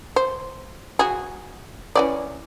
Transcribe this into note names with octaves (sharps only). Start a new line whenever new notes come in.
C5
F#4 G#4
E3 C#4 D5